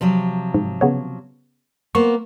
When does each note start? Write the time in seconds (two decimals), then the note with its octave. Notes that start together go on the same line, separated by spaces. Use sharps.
0.01 C3 F3 F#3
0.54 G#2
0.81 C#3 B3 C#5
1.95 A#3 B3 C5 C#6